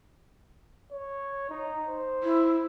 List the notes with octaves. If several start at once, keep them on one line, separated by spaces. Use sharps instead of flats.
C#5
D#4
C5
E4